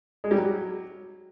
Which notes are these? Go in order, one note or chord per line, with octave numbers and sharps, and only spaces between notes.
G#3
G3
F#3